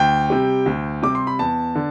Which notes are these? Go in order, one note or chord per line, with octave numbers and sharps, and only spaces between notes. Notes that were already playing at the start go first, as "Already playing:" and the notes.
Already playing: D2 G5
C3 G3
D2
C3 G3 D6
C6
B5
E2 A5
D3